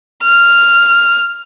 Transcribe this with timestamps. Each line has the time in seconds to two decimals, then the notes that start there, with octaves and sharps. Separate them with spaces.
0.23 F6